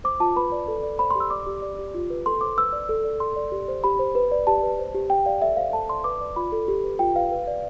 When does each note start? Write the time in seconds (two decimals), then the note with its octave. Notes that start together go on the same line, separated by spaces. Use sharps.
0.04 C5 D6
0.20 F4 A5
0.36 B4 B5
0.52 D5
0.68 A4
0.83 D5
0.99 C5 B5
1.11 C6
1.15 G4
1.20 E6
1.30 D5 D6
1.47 G4
1.62 D5
1.79 G4
1.94 F4
2.10 B4
2.26 A4 C6
2.41 C5 D6
2.57 B4 E6
2.73 D5
2.89 A4
3.04 D5
3.20 A4 C6
3.36 D5
3.52 G4
3.68 C5
3.84 G4 B5
3.99 C5
4.15 B4
4.32 D5
4.47 G4 A5
4.63 B4
4.79 C5
4.95 G4
5.10 G4 G5
5.26 D5 F5
5.42 A4 E5
5.57 C5 F5
5.73 A4 A5
5.89 D5 C6
6.04 B4 D6
6.21 D5
6.36 F4 B5
6.52 A4
6.68 G4
6.84 B4
6.99 F4 G5
7.15 B4 F5
7.32 B4
7.47 D5